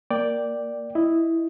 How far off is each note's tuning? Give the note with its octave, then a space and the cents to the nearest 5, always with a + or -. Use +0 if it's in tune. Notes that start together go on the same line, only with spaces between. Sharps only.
A#3 +0 D5 +0 G5 +0
E4 +0 D#5 +0